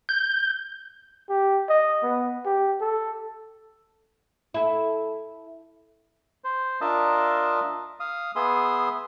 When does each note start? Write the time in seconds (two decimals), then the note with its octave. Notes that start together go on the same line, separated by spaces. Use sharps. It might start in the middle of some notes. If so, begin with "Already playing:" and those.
0.09 G6
1.30 G4
1.69 D#5
2.02 B3
2.46 G4
2.81 A4
4.54 E4 A4
6.44 C5
6.81 D4 F4 A#4 D#5 E5 A5
8.00 F5 D#6
8.36 B3 G#4 E5 C6 D#6